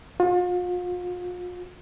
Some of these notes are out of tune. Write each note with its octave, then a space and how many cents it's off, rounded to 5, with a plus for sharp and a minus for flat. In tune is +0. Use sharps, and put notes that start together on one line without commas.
F4 +40